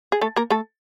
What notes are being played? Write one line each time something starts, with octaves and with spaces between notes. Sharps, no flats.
G#4
A3 A4
A#3 A#4
A3 A4